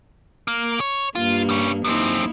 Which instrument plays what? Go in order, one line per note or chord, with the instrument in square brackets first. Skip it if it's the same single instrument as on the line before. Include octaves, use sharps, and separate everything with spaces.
[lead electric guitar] A#3
C#5
[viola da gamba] G2 A#3 [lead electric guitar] F4
[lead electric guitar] G3 C#4
[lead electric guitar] F#2 C4 [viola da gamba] A#3 D#4 E4